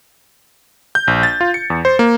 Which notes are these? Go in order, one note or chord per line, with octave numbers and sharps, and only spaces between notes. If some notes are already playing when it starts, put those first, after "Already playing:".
G6
A#1
A6
F4
C#7
E2
C5
A#3